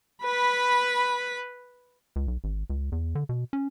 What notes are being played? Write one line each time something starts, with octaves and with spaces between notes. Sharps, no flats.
B4 B5
C#2
B1
G#1
C#2
E2
D3
B2
C#4